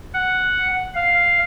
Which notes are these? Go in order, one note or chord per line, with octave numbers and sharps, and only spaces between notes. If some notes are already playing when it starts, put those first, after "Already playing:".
F#5
F5